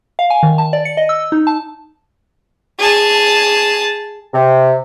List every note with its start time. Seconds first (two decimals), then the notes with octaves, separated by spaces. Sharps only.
0.19 F5
0.30 G#5
0.43 D#3
0.58 A5
0.73 D5
0.85 C#7
0.97 D#5
1.09 E6
1.32 D#4
1.47 A5
2.79 G#4 A5
4.33 C3